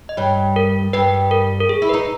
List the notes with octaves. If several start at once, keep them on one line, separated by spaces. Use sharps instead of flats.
D#5
G2 G3 C#5
A#4
G2 G3 B4
A#4
A#4
G#4
E4
B4
D#4